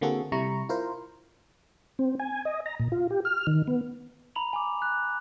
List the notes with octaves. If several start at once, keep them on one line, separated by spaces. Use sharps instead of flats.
D3 A#3 C4 F#4 G#4 A4
C3 G3 E4 A#5 C#6
E4 F4 A#4 C5
C4
G#5
D#5
A#5
A#2
F4
G4
F6
D#3
B3
A#5 B5 F7 F#7
G#5 D6
F#6